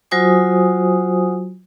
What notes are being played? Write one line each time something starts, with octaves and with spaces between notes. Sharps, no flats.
F#3 F4 F#4 C5 G#5 D#6